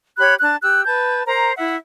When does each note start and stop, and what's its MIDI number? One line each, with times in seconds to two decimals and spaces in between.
0.18 0.34 67
0.18 0.34 73
0.18 0.34 83
0.18 0.34 90
0.40 0.55 62
0.40 0.55 81
0.40 0.55 90
0.62 0.83 67
0.62 0.83 88
0.62 0.83 90
0.85 1.22 71
0.85 1.22 81
0.85 1.22 91
1.26 1.52 70
1.26 1.52 72
1.26 1.52 82
1.56 1.76 64
1.56 1.76 76
1.56 1.76 78